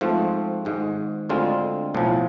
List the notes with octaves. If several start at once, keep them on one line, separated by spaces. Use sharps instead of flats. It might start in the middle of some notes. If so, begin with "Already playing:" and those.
G#2 F3 A3 C4
G#1 G#2 G#3
D2 D3 G#3 C4 F4
B1 A2 F3